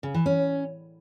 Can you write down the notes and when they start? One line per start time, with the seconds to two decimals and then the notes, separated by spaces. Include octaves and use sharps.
0.03 C#3
0.14 E3
0.26 C#4